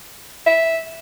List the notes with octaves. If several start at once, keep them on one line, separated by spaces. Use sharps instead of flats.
E5